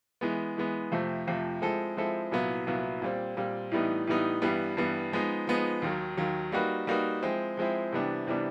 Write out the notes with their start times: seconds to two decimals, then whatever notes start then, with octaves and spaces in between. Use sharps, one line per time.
0.21 E3 G#3 B3
0.57 E3 G#3 B3
0.92 F2 C3 F3 A3
1.27 F2 C3 F3 A3
1.62 F3 G#3 C4 E4 A4
1.97 F3 G#3 C4 E4 A4
2.31 C2 A#2 F#3 B3 E4
2.67 C2 A#2 F#3 B3 E4
3.02 A#2 G3 C4
3.37 A#2 G3 C4
3.71 A2 E3 G3 B3 D#4
4.07 A2 E3 G3 B3 D#4
4.42 G2 E3 G3 B3
4.77 G2 E3 G3 B3
5.12 F3 G#3 B3 D#4
5.47 F3 G#3 B3 D#4
5.82 D#2 D#3 F#3
6.17 D#2 D#3 F#3
6.52 G3 A#3 D#4 F#4 B4
6.87 G3 A#3 D#4 F#4 B4
7.22 F3 G#3 C4 E4
7.57 F3 G#3 C4 E4
7.92 C3 E3 G3 B3 D4
8.27 C3 E3 G3 B3 D4